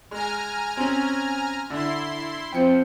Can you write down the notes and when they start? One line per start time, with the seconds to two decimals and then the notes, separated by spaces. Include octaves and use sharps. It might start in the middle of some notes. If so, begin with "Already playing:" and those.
0.11 G#3 G#5 A#5 F6
0.77 C4 C#4
1.70 D3 E4 C6
2.53 F3 C4 G5 C#7